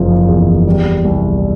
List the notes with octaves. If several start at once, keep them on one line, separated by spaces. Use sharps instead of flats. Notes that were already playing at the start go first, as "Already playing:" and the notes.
Already playing: F#1 C#3 F3
E2
G3
C2